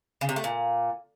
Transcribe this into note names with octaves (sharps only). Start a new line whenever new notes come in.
C#3
C3
A3
A#2